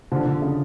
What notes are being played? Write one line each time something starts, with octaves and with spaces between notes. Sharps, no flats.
D3 F3
D3
C#3